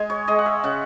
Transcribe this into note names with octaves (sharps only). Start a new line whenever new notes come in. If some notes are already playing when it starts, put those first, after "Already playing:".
Already playing: G#3 G#5
C#5
G#3 D#5
F#5
E5
C#3 F#5